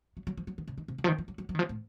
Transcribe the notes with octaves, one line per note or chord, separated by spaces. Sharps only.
F#3
F#3
F3
F#3
D#3
C#3
D#3
C3
C#3
F3
D#3
F3
F#3
F#3
F#3
D#3
F3
A2